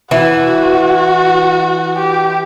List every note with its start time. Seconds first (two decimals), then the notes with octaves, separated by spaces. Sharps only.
0.11 E3 F#4
1.99 G4